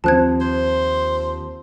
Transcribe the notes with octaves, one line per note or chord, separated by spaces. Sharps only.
D#2 F3 C4 A5 F#6 G#6
C5